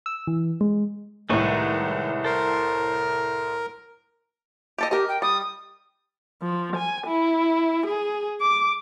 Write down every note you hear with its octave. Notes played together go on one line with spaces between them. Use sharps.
E6
E3
G#3
C2 A2 D#3 G#3 B4 C#6
A4 A#4 C5
G4 A4 D#5
G4 A#4 D#5
G5
G3 D#6
F3
G#5
E4
G#4
D6